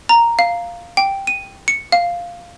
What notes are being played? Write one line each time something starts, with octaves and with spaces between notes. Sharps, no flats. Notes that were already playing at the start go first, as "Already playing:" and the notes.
A#5
F5
G5
D#7
C#7
F5